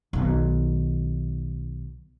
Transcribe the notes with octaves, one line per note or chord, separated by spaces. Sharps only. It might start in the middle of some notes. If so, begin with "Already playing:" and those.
B1 D#3